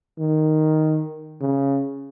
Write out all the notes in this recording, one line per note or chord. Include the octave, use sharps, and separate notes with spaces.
D#3
C#3